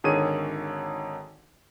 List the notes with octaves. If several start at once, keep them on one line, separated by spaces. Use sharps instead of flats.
G#1 D3 D#3 G#4 C#5 D#7